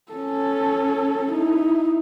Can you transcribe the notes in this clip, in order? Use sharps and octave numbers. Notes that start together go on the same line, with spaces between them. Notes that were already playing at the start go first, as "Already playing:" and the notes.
C#4 A4
D#4 E4